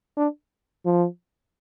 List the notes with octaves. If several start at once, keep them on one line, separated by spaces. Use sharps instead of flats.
D4
F3